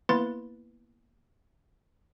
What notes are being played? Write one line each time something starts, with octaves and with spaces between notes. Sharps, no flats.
A#3 B3 E4 B4 C6 A6